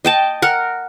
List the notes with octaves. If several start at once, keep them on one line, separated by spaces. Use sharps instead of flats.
D#5 G5 A5
A#4 F#5